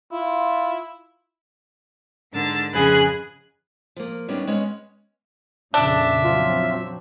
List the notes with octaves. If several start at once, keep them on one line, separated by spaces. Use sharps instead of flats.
E4 F4
G#2 D3 D4 A#4 E6 A6
F2 C#3 G#4 B4 G#5 F#6
F3 A#3
D#3 G3 B3 C#4 D4
G#3 B3 C#4 C#5
F2 A#2 C#3 D4 E5
F3 F#3 C4 F4